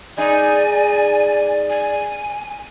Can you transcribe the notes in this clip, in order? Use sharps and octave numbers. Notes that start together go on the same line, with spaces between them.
G#3 D#4 D5 G#5
G#5